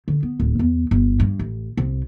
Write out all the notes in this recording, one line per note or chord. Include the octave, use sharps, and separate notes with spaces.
D3
B3
D1
E2
G1
G2
A1
C2